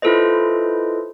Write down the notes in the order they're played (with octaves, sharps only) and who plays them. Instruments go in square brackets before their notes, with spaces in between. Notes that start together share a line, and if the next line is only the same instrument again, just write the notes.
[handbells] E4 F4 A4 B4 C5 D#5